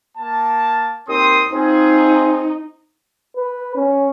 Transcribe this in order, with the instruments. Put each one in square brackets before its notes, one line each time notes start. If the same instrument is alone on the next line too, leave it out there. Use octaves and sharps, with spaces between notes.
[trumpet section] A#3 A5
[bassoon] D#2 [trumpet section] C4 C6 D#6
[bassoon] C4 [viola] D#4 [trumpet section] F4 G#4
[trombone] B4
C#4